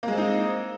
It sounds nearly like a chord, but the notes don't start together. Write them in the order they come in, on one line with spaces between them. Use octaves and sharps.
A#3 G#3 C4 D#4